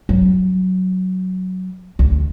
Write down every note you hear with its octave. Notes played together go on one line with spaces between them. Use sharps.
F#3
D2